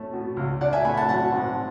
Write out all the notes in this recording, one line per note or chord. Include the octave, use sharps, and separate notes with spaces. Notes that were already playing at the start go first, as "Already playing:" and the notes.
Already playing: A3 C#4
B2
C#2
D4 D5 F#5
E5 G#5
A3 G#5 B5
F#5 A5
F#3 F#5 A5
G#2